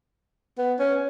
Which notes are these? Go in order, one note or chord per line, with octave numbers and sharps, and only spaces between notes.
B3
C#4